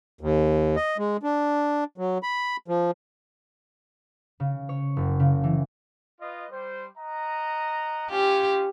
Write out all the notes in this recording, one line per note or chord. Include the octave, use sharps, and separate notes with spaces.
D#2
D#5
G#3
D4
F#3
B5
F3
C#3
C#5
F#1
C#3
E3
F4 B4 D#5
G3 C5
D#5 F#5 A#5
C#4 F4 G4